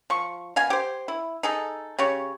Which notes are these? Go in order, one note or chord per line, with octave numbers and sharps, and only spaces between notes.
F3 C#6
B2 F5 G#5
G4 C5
E4
D#4 G#4 A4
C#3 G4 C#5